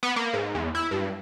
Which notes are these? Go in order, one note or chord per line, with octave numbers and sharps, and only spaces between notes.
B3
A#3
G#2
E2
E4
G2